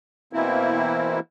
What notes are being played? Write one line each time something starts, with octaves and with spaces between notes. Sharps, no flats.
B2 E3 A#3 C4 E4